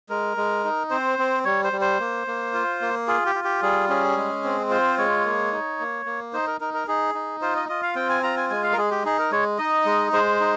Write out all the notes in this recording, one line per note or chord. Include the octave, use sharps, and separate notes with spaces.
G#3 A#4
G#3
D#4
C4 C5
C4
G3 C#5
C5
G3
C5
A#3
A#3
F4
A#3
F4 G#4
G4
F4
G4
G3 G#4
C#4 G#4
G#3
C4
F4 C5
G#3 C#5
A#3
D#4
A#3
A#3
D#4 C5
A#4
D#4 A#4
A#4
D#4 G#4
D#4
F4 C5
D#5
F4 D#5
F5
C4 G5
G#5
F4 A#5
G#5
G#3 G#5
F5
A#4
G#3 G#4
G4
D#4 G#4
A#4
G#3 C#5
D#4 D#5
G#3
G#3 C5
D#4